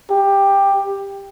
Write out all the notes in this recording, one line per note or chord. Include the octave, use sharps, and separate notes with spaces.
G4